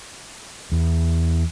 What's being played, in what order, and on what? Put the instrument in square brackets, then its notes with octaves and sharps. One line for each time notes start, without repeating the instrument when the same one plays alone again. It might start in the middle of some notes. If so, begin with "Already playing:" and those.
[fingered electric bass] E2